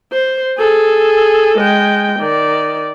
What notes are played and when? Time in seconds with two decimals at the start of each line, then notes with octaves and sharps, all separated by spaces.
0.12 C5
0.59 G#4 A4
1.58 G#3 G5
2.20 D#3 D5